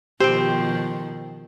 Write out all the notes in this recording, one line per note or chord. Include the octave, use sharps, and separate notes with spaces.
B2 D#3 F3 C4 G4 C5 G5